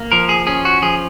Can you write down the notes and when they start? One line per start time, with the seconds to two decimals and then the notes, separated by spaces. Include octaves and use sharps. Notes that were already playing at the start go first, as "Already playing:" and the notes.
Already playing: A#3
0.12 F3 A#4
0.29 G#4
0.47 C#4 G#4
0.65 F#4
0.82 F3 G#4